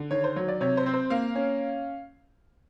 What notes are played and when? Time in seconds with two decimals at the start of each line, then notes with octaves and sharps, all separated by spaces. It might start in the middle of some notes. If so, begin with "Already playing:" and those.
Already playing: D3
0.11 D#3 C#5
0.24 C5
0.36 F#3 C#5
0.48 D5
0.61 C3 C#5
0.77 C5
0.86 C4
0.94 C5
1.10 A#3 F5
1.35 C#4